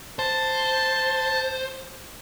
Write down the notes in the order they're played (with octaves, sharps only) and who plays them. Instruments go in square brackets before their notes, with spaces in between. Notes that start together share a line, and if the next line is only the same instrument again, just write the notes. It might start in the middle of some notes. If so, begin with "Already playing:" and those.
[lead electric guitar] C5 [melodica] A5